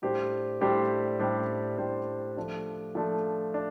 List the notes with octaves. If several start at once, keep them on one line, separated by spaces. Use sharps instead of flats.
A2 G3 D4 G4 C5
A2 G3 D4 G4 C5
A2 G3 D4 G4 C5
A2 G3 D4 G4 C5
F3 A3 D4
F3 A3 D4
D4